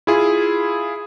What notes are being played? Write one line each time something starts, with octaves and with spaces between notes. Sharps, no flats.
E4 F4 G#4